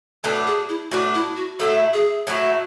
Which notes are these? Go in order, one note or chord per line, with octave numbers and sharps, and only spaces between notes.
A2 F#3 B3 D4 A4
G#4
E4
A2 F#3 B3 D4 F#4
E4
F#4
A2 F#3 A3 E4 A4
G#4
A2 F#3 A3 E4 F#4